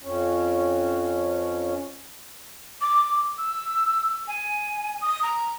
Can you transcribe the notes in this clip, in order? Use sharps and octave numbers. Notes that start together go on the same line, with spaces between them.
F2 C#4
D6
E6
G#5
D#6
A#5